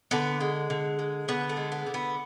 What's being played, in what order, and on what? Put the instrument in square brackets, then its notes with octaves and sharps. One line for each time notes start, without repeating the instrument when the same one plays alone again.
[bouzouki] D3 B3
G#3
D3
G#3
D3 B3
A3
G#3
B3
D3
B3